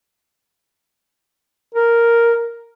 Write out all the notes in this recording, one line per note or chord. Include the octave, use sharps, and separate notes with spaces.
A#4